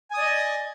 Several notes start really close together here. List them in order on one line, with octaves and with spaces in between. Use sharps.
G#5 D#6 D5 D#5